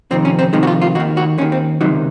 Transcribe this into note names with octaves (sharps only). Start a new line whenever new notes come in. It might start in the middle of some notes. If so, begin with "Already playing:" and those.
F2 C3 D#3 C4
C#4
C4
F2 C3 D#3 G#3
F#4
F4
F4
D#2 D#3 F#4
F#4
D#2 D#3 C#4
C4
C#2 C3 D#3 F#3